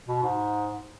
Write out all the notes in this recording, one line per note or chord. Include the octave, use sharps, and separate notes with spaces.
B2
G#2